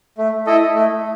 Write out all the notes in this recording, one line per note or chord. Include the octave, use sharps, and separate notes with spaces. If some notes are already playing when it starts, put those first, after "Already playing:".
A3
E4 A4 D#5
A3